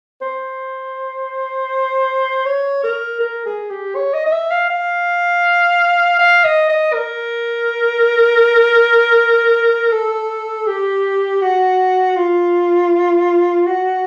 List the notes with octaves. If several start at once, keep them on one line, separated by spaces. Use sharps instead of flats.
C5
C#5
A#4
A#4
G#4
G4
C#5
D#5
D#5
E5
F5
F5
F5
D#5
D#5
A#4
A4
G4
F#4
F4
F#4